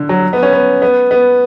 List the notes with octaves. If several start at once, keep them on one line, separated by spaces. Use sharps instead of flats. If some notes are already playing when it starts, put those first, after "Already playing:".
Already playing: D3
F#3
B3
C#4
B3
B3
B3